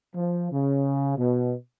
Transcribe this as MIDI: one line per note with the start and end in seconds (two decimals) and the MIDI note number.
0.15 0.50 53
0.51 1.17 49
1.18 1.54 47